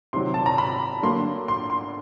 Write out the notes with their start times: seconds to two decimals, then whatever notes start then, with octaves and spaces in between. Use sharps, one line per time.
0.13 C3 D#3 F#3 C6
0.34 A5
0.46 A#5
0.58 B5
1.03 D3 F#3 A#3 C6
1.48 C6
1.70 C6